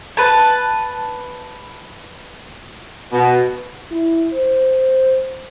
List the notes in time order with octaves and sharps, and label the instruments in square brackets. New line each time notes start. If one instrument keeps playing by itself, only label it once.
[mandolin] B4 A5
[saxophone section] B2
[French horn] E4
C5